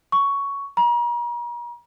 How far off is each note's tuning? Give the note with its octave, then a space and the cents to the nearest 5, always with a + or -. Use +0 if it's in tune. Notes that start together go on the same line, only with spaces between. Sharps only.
C#6 +10
A#5 +40